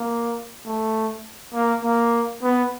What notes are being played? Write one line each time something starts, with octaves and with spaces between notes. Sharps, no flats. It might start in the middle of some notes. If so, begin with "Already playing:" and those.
Already playing: A#3
A3
A#3
A#3
B3